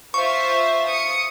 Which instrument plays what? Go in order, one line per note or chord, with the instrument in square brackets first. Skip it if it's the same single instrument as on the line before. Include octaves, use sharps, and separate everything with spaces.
[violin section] F4 C5 E5 [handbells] C#6
[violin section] D#6 C#7